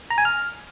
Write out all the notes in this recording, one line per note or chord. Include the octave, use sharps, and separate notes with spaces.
A#5
G#5
F6